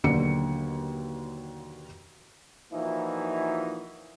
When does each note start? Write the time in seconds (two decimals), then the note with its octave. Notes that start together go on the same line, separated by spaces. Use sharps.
0.04 D#2 B2 D3 F#3 C#7
2.72 A#2 E3 F3 D#4 E4 F#4